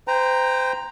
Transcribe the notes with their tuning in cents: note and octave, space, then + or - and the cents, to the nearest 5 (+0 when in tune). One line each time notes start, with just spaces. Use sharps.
C5 -30 G5 +15 A#5 +0